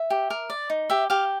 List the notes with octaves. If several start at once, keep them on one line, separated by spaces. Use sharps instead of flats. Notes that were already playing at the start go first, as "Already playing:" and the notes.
Already playing: E5
G4
A#4
D5
D#4
G4 E5
G4 F5